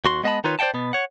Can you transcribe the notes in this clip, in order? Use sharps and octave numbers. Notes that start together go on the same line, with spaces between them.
D#2 F#4 C6
G#3 B3 D#5 E5 A5 B5
D#3 D#4 F4 B4 C#5
C5 D5 F#5 G5 A5
B2 B3
C#5 F#5